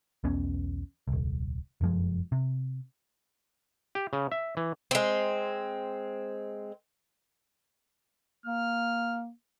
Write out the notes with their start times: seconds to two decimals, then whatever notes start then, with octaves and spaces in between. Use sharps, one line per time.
0.24 B1 E2 B3 C#4
1.08 D#1 C2
1.81 F1 F#2 F3 G#3
2.32 C3
3.95 G4
4.13 C#3
4.32 E5
4.57 E3
4.91 G#3 C4
8.46 A#3 F6